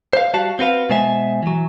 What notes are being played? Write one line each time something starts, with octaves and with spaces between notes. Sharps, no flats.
C5 F5
G3 F#4 F5 A5
C4 F#4 B4 F5
B2 G#3 C5 E5 G#5
E3 F#3